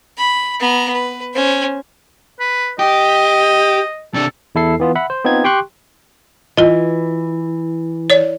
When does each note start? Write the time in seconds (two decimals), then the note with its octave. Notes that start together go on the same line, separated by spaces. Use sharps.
0.18 B5
0.59 B3 A#5
0.94 B4
1.35 C#4 C5
2.40 B4
2.79 G4 D#5
4.14 C3 D4 A4
4.55 E2 E4 A4 C7
4.80 E3 B3 F4
4.95 E5 F#5 B5
5.10 C5
5.25 B3 C4 D#4 F4 G#6
5.44 G4 G5 C6 C#6 F#6
6.57 E3 F4 D#5
8.10 C#5 D5